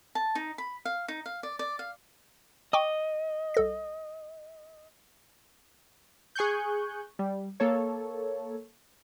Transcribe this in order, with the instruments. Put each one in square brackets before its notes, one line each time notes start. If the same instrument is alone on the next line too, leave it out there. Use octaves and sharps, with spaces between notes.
[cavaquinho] A5
D#4
B5
F5
D#4
F5
D5
D5
F5
[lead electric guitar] D#5 [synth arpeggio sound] G5 C#6 D6
[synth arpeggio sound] C2 A4 A#6
[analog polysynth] G#4 G#5 C#6 F#6 G6
G3
A#3 A4 C#5